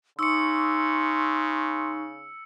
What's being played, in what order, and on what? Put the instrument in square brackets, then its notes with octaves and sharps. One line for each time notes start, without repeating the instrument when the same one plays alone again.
[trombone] C#3 [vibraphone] D#4 C#6 [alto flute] C6 [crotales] E6 C#7